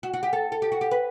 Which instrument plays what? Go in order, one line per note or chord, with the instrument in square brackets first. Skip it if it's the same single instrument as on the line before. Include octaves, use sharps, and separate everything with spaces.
[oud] F#4
F#4
G4
A4
A4
G4
F#4
G4
B4